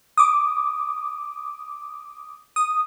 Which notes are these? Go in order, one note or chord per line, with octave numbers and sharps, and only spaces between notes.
D6 D#6
D#6